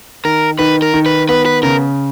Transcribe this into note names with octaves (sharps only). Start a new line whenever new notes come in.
D#3 A#4
D#3 B4
A#4
D#3
B4
B3 B4
B4
C#3 A#4